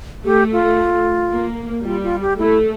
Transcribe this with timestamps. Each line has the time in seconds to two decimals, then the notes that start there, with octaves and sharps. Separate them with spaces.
0.24 A3 G4
0.52 F4
1.32 A#3
1.85 G3 F4
2.03 F4
2.21 G4
2.39 A3 E4